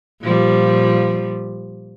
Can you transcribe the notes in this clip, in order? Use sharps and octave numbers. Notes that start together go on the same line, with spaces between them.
A#2 F3 G3